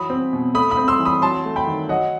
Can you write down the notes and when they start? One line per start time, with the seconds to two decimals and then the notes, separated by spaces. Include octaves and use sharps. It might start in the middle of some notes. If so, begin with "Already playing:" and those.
Already playing: E3 F#3 B5 D#6
0.10 C4
0.33 B2
0.54 A3 B5 D#6
0.71 B5 D#6
0.77 C4
0.88 C6 E6
0.99 E3
1.05 B5 D#6
1.22 F#3 A5 C6
1.45 A3
1.56 G5 B5
1.67 D#3
1.89 F#3 D#5 F#5